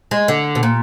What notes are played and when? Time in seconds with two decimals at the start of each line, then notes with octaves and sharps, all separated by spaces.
0.11 G#3
0.28 D3
0.55 B2
0.63 A#2